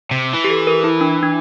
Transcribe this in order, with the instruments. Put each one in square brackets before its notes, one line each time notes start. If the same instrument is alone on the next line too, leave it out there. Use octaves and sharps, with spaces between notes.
[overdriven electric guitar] C3
E3
[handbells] G4
A4
A#4
E4
D4
D4